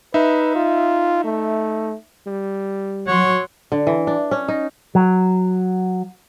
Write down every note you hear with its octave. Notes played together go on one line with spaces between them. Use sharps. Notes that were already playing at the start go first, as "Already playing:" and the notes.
D#4 B4 E5
F4
A3
G3
F#3 C#5 F#5 C6
D3
E3
D4
C#4
D#4
F#3